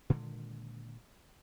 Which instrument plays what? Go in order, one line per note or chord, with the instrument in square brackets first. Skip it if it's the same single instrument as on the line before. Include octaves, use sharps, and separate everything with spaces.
[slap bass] A#2 D3 D#3 G#3